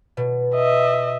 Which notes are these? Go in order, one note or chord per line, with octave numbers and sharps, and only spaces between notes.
B2
D#5 E5